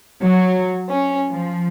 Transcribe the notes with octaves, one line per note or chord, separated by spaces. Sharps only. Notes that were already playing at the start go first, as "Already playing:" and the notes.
F#3
C#4
F3